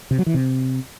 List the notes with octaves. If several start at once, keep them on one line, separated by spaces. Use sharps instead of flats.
C3
F#3
E3
C3